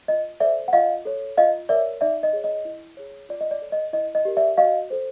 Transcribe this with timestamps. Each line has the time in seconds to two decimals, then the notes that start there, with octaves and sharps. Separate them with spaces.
0.08 F4 D#5
0.40 A4 C5 D5 E5
0.68 F#5
0.73 F4 D#5 F5
1.05 A4 C#5
1.37 F4 D#5 F5
1.69 A#4 C#5 D5 E5
2.01 D#4 D5 E5
2.23 D#5
2.33 G#4 C#5
2.44 D#5
2.65 E4
2.97 G#4 C#5
3.29 F4 D5
3.41 D#5
3.51 D5
3.62 A4 C#5
3.72 D#5
3.93 E4 D#5
4.15 D#5
4.25 G4 A#4
4.37 D5 E5
4.57 F#4 D#5 F5
4.90 A4 C5